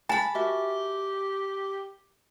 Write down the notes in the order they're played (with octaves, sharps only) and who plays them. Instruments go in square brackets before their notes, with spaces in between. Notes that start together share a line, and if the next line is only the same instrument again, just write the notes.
[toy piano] G#5 [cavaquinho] A5 B5
[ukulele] F#4 A#4 E5 [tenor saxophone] G4